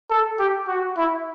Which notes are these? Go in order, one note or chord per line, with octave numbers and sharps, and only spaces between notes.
A4
G4
F#4
E4